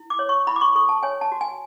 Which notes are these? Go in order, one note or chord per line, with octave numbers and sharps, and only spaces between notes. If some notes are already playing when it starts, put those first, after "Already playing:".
Already playing: E4
D6
C#5
C#6
E4 B5
D6
C#6
A4 C#6
A5
C#5 G#5
A5
F#4
G#5